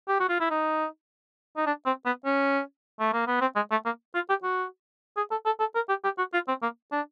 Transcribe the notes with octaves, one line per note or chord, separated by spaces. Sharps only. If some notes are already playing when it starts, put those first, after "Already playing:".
G4
F#4
F4
E4
D#4
D#4
D4
C4
B3
C#4
A3
A#3
B3
C4
G#3
A3
A#3
F4
G4
F#4
G#4
A4
A4
A4
A#4
G4
G4
F#4
F4
C4
A#3
D4